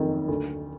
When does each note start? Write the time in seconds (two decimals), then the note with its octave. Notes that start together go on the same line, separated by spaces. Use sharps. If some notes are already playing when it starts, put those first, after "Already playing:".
Already playing: F#1 F2 D#3
0.28 D2